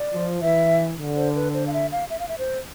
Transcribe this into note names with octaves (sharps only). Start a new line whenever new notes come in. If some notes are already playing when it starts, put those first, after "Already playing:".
Already playing: D5
F3
E3 E5
D3
C5
B4
C5
F5
E5
F5
E5
F5
E5
C5